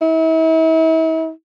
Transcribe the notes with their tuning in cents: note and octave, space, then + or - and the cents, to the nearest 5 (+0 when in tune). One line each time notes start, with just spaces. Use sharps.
E4 -40